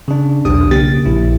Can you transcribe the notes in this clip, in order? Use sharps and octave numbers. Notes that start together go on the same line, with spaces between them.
C#3 D4
B1 E2 D4 G4 D#6
C#3 A#3 G4 A6
A#1 E4